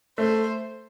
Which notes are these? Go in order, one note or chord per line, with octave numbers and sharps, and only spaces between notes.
A3 C5